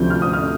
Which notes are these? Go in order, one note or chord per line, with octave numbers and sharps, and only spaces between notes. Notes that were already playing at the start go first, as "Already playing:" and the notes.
Already playing: D2 C3 F3 C4 G6
F6
D#6
F6